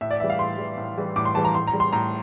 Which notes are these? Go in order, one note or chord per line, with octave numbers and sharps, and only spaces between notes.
A2 E5
D5
E3 G3 E5
F5
A2 C6
E3 G3
A2
E3 G3
A2 D6
C6
E3 G3 A5
A#5
A2 C6
A#5
G3
C6
A2 A#5